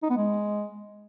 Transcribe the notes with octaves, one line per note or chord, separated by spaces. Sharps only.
D#4
B3
G#3